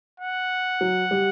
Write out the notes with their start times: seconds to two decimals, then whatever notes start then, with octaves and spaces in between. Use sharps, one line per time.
0.20 F#5
0.81 F#3
1.11 G3